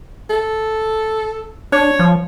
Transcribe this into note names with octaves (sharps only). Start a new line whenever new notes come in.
A4
D4 C#5
F3